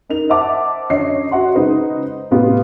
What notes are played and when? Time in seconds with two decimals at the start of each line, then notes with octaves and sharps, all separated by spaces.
0.09 D#4 A#4 F7
0.29 C5 D#5 E5 F#5 A5 D6
0.90 F#2 D3 C#5 D#5 C7
1.31 F#4 E5 F#5 C6
1.54 C#3 G#3 D#4 B4 C5
2.31 A2 C3 B3 F4 G4